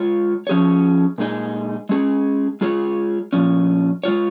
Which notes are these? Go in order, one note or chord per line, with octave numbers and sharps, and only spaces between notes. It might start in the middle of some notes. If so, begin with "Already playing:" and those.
Already playing: G#3 F4 C#5
F3 C#4 G#4 C#5
A#2 G#3 D#4 G#4 D#5
G#3 C#4 G#4
G#3 F4 G#4 C#5
A#2 F3 C#4
G#3 F4 C#5